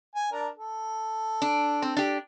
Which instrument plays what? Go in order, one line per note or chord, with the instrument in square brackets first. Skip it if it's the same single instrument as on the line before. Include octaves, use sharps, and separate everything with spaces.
[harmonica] G#5
D4 A#4
A4
[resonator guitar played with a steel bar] D4
C4
D4 G4